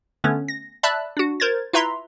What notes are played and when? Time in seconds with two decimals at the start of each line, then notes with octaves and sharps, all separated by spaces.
0.24 D3 A3 B3 C#4
0.48 A#6
0.83 D5 E5 A5 B5 E6 F#6
1.17 D4 F#4
1.40 A#4 C5 G#6 A6
1.73 E4 F4 B4 E5 A#5 C6